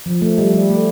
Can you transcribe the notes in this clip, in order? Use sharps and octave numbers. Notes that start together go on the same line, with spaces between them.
F3
A3
G3
G3
A3